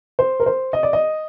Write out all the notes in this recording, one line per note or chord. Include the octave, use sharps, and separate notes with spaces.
C5
A#4
C5
D#5
D5
D#5